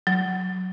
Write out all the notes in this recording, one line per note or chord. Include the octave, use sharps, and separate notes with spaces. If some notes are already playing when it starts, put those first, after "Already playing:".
F#3